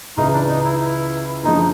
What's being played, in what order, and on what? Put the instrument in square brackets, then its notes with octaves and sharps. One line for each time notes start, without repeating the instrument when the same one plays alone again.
[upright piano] C#2 C#3 E3 [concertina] D#4
[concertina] D4
D#4
E4
E4
[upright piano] F#2 D3 F3 G#3 [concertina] D#4